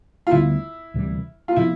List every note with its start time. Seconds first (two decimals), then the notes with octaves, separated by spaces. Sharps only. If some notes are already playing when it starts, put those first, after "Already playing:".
0.27 F4
0.31 D2 D3 G3 B3 E4
0.94 D2 C3 E3 G3
1.48 F4
1.56 C3 F3 B3 E4